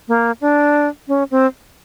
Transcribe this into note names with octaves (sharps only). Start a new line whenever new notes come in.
A#3
D4
C#4
C4